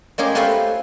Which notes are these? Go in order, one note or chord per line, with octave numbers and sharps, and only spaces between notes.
G#3 A#3 C#4 G4 G#4
A3 C4 F4 B4 C5 E5